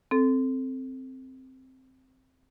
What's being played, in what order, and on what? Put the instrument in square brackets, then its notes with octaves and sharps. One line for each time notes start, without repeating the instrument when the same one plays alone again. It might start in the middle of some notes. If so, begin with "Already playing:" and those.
[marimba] C4 A4